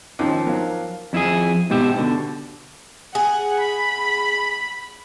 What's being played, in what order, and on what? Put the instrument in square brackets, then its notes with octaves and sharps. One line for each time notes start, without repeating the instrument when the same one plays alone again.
[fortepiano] D#2 G#2 C#4 [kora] F3 C4 [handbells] D#4 D6
[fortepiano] F#3 [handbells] A#4 F5
[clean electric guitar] F2 E4 F4 G#4
G#2 B2 G4 E5
B2 D3
[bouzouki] G#4 [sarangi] F#5
[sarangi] B5